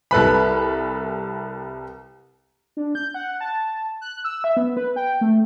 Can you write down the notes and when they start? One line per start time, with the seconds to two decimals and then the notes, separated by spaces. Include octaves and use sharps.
0.11 C2 A4 B4 B5
2.77 D4
2.95 G6
3.14 F#5
3.41 A5
4.01 F#6
4.24 E6
4.44 E5
4.57 B3
4.77 B4
4.96 G5
5.21 A3